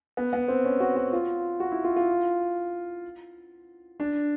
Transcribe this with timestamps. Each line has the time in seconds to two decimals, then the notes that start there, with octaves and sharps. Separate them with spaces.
0.17 B3
0.33 B3
0.48 C4
0.64 C#4
0.80 F#4
0.96 F#4
1.13 F4
1.60 F#4
1.72 E4
1.84 F4
1.96 F4
4.00 D4